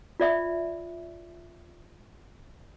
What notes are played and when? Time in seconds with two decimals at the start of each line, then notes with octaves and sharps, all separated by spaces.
0.20 F4 D5 E5